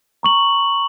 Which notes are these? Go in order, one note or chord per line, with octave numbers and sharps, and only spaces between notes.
A#5 C#6 F#7